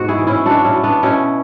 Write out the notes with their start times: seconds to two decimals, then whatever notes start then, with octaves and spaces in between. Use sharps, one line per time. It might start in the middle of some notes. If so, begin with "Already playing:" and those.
Already playing: G#2 B2 F#4
0.08 E4 G#4
0.18 E3
0.27 C#4 E4
0.46 B2 D4 F#4
0.64 C#4 E4
0.75 F#3
0.84 B3 D4
1.03 B2 C#4 E4